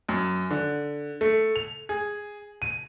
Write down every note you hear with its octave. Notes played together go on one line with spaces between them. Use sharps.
F#2
D3
A3
F7
G#4
D#7